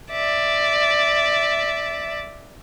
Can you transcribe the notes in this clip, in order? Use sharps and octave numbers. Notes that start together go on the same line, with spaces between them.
D5 E5